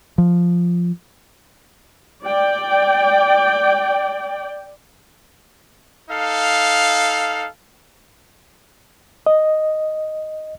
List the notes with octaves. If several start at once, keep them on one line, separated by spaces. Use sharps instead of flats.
F3
D5 G5
D#4 A4 F5
D#5